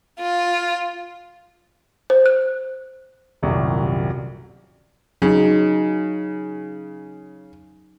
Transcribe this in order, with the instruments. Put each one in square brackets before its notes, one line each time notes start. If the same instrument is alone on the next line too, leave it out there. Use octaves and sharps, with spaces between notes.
[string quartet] F4
[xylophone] C5
F#6
[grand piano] D#1 C2 F#2
[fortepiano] C#3 [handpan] F#3 D#4